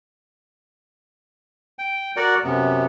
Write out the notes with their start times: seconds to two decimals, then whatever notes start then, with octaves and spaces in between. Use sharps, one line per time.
1.79 G5
2.16 F#4 A#4 D5 F#5
2.44 F#2 C3 B3